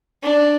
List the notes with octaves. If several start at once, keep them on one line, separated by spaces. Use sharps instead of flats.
D4